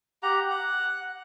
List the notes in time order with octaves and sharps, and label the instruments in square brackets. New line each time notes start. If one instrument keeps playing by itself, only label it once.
[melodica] G4 F#5 A#5
F#5